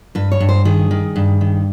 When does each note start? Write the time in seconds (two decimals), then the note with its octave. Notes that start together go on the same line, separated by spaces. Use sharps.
0.15 G2 B4
0.32 C#5
0.40 G2
0.49 C5
0.65 D#3 G#4
0.91 D#3
1.16 G2
1.41 D#3